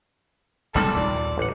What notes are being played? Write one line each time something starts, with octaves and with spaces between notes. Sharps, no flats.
F#1 B1 F#2 C3 G3 A4
D#2 A#2 D5
A1 F#5